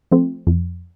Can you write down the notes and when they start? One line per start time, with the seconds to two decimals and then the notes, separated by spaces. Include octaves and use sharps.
0.12 F3 A3 C4
0.47 F2